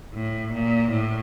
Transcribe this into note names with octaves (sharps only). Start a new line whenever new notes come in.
A2
A#2
A2